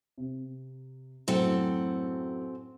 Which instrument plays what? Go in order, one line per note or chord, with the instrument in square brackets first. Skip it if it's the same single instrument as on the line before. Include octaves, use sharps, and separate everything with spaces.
[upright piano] C3
[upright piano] F#2 A2 G5 [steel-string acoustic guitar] C4 A4 F#5